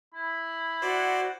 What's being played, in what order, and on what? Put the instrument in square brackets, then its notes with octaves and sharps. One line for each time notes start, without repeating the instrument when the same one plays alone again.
[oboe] E4 [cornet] B5
[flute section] F#4 F#5 [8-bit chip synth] C5 D5